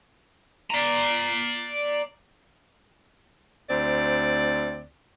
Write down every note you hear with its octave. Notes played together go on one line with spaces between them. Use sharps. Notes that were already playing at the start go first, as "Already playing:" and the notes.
D5 A#5
D2 C4 D5